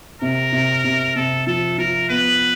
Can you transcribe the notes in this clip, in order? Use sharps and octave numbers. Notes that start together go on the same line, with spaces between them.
C3 A#4
C3
C3
C3 A4
F3 A4
F3 A#4
B3 B4